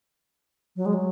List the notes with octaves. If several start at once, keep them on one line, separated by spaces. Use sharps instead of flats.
F#3
G#3
F#3